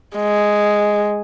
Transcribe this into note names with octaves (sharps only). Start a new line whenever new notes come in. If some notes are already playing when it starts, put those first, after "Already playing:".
G#3